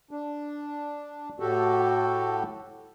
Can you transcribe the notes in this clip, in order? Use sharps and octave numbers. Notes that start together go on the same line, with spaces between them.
D4
A2 F#4 G4 A4